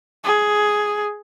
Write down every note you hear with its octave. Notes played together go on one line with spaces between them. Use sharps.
G#4